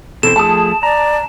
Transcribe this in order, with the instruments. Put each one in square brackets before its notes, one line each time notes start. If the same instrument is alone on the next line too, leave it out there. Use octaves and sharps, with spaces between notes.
[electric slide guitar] B2 E3 C4 [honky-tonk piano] A4 [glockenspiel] E7
[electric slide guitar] F3 A3 [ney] G#4 [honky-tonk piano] A5 D#6
[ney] D5 [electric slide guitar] A#5